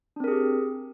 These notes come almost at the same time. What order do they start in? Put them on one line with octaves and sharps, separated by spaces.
D4 C4 A#4 G#4 G4